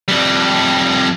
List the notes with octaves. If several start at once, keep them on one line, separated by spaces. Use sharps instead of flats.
F2 G3